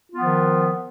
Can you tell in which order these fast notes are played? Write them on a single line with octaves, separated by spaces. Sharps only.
F4 B3 F3 D#3